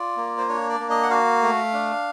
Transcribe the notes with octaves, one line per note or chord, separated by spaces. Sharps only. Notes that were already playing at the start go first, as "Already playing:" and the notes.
Already playing: F4 D5
A#3
C5
D4 C#5
D5
A#3
D#5
F#5
F#4 F5
A3
D4